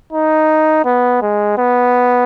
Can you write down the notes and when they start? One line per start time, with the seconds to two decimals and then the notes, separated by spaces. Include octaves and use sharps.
0.13 D#4
0.85 B3
1.22 G#3
1.58 B3